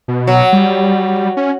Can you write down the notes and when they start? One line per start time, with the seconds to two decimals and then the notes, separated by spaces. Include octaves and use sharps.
0.08 B2
0.27 F#3
0.53 G3
1.37 C#4